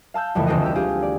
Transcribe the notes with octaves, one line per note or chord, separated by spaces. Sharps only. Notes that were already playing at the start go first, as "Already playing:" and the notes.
F5 A5 E6 G6
C2 F2 C#3 E3 A3
E1 D2 C4 F4 A4 D#5
G4 E6
F4 G4 G#4 F5
D5